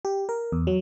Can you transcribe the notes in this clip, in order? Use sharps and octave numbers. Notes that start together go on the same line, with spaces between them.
G4
A#4
E2
F#3